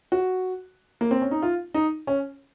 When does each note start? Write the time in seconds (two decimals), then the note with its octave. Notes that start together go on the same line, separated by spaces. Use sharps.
0.12 F#4
1.01 A#3
1.11 C4
1.22 C#4
1.31 D#4
1.42 F4
1.74 D#4
2.07 C#4